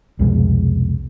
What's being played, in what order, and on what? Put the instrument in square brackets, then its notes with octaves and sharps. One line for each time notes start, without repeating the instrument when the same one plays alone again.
[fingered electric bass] C2 F2 B2 G#3